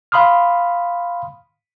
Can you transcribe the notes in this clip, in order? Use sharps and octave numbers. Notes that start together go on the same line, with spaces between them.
F5 B5 C6 D#6 F6